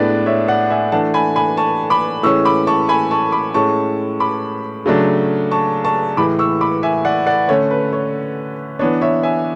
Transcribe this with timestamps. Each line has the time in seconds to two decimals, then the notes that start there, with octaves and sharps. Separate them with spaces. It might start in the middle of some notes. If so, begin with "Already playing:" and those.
Already playing: A2 G#3 B3 D4 B4 D5
0.26 C#5 E5
0.48 D5 F#5
0.70 E5 G#5
0.92 E3 A3 D4 F#5 A5
1.14 G#5 B5
1.36 G#5 B5
1.57 A5 C#6
1.90 B5 D6
2.23 A2 E3 G#3 C#4 C#6 E6
2.45 B5 D6
2.67 A5 C#6
2.89 G#5 B5
3.11 A5 C#6
3.32 B5 D6
3.54 A2 G#3 C#4 A5 C#6
4.20 B5 D6
4.86 C#3 F#3 A3 D4
5.51 A5 C#6
5.85 A5 C#6
6.17 A2 E3 G#3 B5 D6
6.39 C#6 E6
6.61 B5 D6
6.83 E5 G#5
7.05 D5 F#5
7.26 D5 F#5
7.48 D3 A3 C#4 C#5
7.70 B4
7.93 C#5
8.79 E3 B3 D4 C#5
9.01 C#5 E5
9.23 E5 G#5